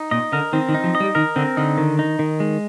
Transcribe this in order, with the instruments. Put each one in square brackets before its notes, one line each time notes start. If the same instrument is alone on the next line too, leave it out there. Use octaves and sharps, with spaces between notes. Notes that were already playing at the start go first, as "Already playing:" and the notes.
Already playing: [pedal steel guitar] D#4
[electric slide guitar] A#2 [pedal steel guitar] D#5
[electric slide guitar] D3 [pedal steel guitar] A#4
[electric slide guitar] D#3 [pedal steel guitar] C4
[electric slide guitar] D#3
[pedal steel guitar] D#4
[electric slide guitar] F3
[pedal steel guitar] D#5
[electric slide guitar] G3
[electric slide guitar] D#3 [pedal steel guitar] A#4
[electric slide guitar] D3 [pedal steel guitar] C4
[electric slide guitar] D3 [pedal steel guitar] D#4
[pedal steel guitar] D#3
D#4
D#3
G#3